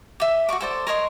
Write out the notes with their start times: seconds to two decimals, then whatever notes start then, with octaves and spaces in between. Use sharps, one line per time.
0.20 G4 E5
0.49 F#4 A#4 C#6 D6
0.61 A4 C5 D5
0.87 A#4 C#5 D#5 C6